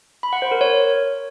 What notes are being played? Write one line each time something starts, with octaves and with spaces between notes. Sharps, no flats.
B5
F#5
C5
A#4
C#5